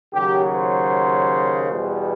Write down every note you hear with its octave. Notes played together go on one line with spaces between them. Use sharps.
D#2 C#3 F#3 G4
C5
E2 B2 G3